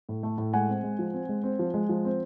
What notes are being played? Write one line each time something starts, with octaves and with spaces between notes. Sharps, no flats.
A2
A3
A2
G#3 F#5 G#5
C4
G#3
F3
C4
G#3
C4
F3
G#3
F3
C4